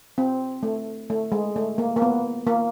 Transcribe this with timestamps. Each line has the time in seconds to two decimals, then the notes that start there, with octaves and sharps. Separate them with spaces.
0.18 C4
0.63 A3
1.10 A3
1.32 G#3
1.56 A3
1.78 A#3
1.96 A#3
2.02 B3
2.47 A#3